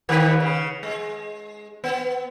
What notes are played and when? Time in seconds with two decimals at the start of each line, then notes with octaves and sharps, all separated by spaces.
0.09 D#2 D#3 B4
0.40 C#3
0.83 G#3
1.84 B3